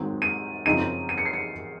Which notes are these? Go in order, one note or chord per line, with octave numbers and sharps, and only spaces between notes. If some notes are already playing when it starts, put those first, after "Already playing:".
Already playing: G#2 D#3 F#3 C4
D#7
F#2 C#3 F3 C4 D#4 D#7
D#7
C#7
C7
C#7